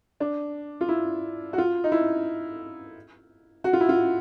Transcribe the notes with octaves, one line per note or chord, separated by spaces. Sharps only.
D4
F4
E4
F#4
F4
D#4
E4
F#4
F4
E4
F4